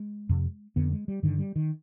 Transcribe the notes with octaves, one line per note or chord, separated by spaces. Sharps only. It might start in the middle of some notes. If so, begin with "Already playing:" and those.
Already playing: G#3
F2 C3
F2 D3 B3
G#3
G3
G2 D3 D#3
G3
D#3